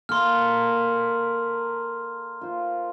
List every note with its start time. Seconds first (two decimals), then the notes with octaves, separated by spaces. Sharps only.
0.09 A#3 A4 A#4 C6 F6
2.41 F4 C5